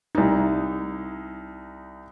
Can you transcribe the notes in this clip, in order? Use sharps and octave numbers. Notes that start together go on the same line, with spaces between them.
C2 D#4